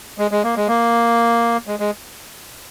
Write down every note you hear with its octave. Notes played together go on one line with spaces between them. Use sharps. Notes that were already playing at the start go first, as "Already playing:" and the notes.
G#3
G#3
A#3
G#3
A#3
G#3
G#3